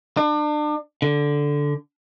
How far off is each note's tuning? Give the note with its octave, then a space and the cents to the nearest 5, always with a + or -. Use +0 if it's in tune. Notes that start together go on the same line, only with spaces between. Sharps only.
D4 +35
D3 -5